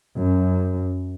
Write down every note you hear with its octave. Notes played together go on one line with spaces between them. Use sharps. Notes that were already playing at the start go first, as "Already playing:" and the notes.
F#2